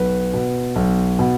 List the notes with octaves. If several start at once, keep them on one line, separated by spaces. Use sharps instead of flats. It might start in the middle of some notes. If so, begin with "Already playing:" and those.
Already playing: B1 B4
B2
B1
B2